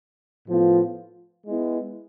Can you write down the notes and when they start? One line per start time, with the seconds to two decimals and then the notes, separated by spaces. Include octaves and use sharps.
0.47 A2 F3 B3 F4
1.45 G#3 B3 E4